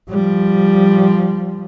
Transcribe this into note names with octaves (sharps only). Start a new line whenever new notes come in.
F3 G3